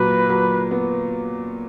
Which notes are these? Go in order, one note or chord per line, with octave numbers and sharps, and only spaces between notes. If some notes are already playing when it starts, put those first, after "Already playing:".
Already playing: A#2 F#3 B4
F#3
B3